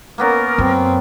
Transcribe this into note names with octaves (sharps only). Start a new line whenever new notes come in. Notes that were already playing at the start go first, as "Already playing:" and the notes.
A#3 B3 C#4 A#4
F#2 C4